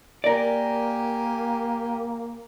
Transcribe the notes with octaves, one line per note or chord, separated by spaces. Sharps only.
A#3 G4 A#4 D5 G#5